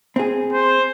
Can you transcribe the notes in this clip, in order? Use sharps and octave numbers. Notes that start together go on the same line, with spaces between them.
C4 G#4
C5